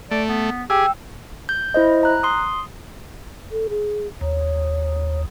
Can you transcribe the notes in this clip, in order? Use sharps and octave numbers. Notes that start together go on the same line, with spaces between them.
A3 D5
B3
G4 G#4 G5 E6
G6
E4 C5 D#5
A#5 F#6
C6 D#6
A4
G#4
D#2 C#5